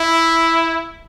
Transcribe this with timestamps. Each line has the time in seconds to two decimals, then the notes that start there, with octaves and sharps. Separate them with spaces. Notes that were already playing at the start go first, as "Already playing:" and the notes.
Already playing: E4